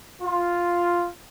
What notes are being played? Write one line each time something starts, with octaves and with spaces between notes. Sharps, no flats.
F4